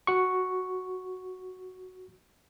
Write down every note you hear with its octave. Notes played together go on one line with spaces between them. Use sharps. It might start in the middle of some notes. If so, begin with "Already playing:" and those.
F#4 C#6